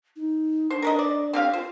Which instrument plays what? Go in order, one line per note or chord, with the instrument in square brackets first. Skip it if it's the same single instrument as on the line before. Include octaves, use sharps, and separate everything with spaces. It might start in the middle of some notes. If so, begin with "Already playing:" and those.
[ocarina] D#4
[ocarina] D4 [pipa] C5
[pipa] A#4 B4 D#5
D5
C4 G4 F5
[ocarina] F4 [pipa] C5